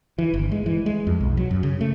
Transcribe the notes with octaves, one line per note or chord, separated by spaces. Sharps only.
E3
G1
G#3
E3
G#3
F2
B1
F#3
F#2
C#3
A3